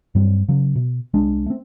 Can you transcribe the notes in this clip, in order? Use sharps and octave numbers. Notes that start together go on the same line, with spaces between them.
G2 F#3 G3 C4
C#3 F#3
B2
C2 G#3 D4
A3 C4